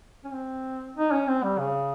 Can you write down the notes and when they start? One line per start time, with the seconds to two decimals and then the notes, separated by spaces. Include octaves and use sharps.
0.24 C#4
0.32 C4
0.96 D#4
1.12 C#4
1.27 C4
1.43 G3
1.59 C#3